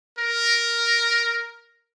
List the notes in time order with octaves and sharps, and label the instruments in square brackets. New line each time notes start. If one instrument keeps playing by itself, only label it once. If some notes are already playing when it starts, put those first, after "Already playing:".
[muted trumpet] A#4